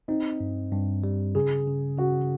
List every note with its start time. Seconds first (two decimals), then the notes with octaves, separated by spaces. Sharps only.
0.08 C4 D#4
0.40 G2
0.72 G2
1.04 G3
1.35 C#3 G#4
1.67 C#3
1.98 C#3 F#4